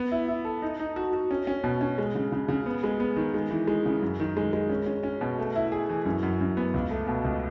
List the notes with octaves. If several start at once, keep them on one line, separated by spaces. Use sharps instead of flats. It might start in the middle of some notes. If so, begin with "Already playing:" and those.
Already playing: B3
E4
E4
A4
D#4
D#4
F#4
F#4
C#4
C#4
B2
C#4
G#3
C#3
C#3
C#3
B3
G#3
B3
D#3
G#3
E3
G#3
C#3
F#2
D#3
G#3
G#3
C#4
C#4
C#4
B2
A3
E4
G#4
E3
F#2
F#2
F#2
B3
C#2
A3
B2
C#2